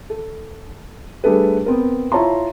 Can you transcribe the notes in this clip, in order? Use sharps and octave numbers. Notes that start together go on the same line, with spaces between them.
A4
G3 A3 D4 G#4 A4 B4
B3 C4 A#4
E4 F4 C#5 A5 A#5 C6